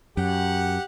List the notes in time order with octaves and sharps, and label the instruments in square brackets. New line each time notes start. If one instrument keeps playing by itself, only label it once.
[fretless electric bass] F#2 [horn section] G4 F#5